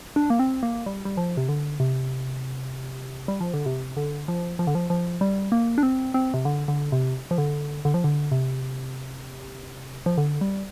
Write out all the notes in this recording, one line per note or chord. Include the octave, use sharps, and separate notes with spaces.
D4
A#3
C4
A#3
G3
G3
F3
C3
D3
C3
G3
F3
D3
C3
D3
F3
F3
D3
F3
F3
G3
A#3
D4
C4
C4
C3
D3
D3
C3
F3
D3
D3
F3
D3
C3
F3
D3
G3